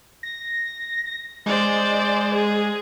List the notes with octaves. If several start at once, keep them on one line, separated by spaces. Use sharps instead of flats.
A#6
G#3 C5 D5
G#4